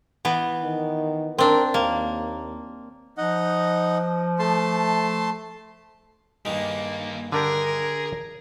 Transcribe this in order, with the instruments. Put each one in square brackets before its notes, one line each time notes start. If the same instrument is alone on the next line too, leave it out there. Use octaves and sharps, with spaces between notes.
[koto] E3 B3
[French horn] D#3
[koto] C4 D4 [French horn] A#4
[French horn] D#2 [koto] A#3
[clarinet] F3 [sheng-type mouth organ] D#4 D#5 F#5
[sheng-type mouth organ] A3 A5 C6
[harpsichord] G2 D#3 G#3 [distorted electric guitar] A#3 G4
[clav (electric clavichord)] D3 D4 G4 [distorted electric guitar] G#4 [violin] A#4